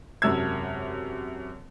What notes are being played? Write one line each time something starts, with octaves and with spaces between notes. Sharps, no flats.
E1 F#2 C3 E6 G#6